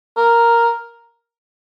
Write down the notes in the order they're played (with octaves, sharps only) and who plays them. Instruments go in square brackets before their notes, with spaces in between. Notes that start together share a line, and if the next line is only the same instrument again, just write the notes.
[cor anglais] A#4